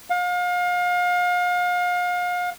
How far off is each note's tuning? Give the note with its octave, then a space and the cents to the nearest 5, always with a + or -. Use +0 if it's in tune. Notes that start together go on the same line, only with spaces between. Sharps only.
F5 +35